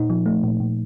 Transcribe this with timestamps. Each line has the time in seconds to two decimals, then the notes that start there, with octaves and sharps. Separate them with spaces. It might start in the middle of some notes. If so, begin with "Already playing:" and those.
Already playing: A#2 D#4
0.10 F3
0.26 A3
0.43 A#2
0.60 A#2